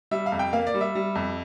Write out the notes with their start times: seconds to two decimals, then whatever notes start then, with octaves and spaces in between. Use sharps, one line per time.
0.11 G3 E5
0.26 F5
0.32 F2
0.39 G5
0.53 A#3 F5
0.67 D5
0.74 G3
0.81 E5
0.95 G3
1.15 F2